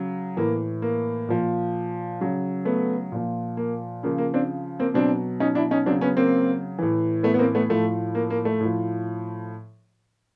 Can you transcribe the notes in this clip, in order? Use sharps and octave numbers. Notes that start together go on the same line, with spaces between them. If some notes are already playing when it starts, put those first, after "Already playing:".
Already playing: C#3 F#3
A2 E3 A#3
A#3
A#2 F3
C#3 F#3
A3 B3
A#2 F3
A#3
C#3 F3 A#3
A#3
C4 D4
A#3 C4
B2 F#3 C4 D4
C#4 D#4
D4 E4
C#4 D#4
C#3 F#3 C4 D4
B3 C#4
A#3 C4
A2 E3
A3 B3
B3
A#3 C4
A3 B3
A2 F3 A3
A#3
A#3
A3
A2 F3